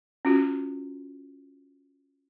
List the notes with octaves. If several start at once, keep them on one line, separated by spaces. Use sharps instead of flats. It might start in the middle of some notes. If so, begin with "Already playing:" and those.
C#4 F4 F#4